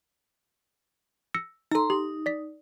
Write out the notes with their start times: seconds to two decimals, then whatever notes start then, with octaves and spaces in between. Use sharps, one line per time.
1.34 E6 A#6 C#7
1.71 D#4 A4 A#5 C6
1.90 D#4 G4
2.26 D5 B6